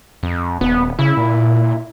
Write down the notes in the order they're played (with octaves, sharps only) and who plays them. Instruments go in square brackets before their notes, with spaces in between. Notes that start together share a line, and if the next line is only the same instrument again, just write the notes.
[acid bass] F2
[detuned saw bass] D#1 [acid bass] B3
[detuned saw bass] C#3 [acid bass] E4
[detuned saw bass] A#2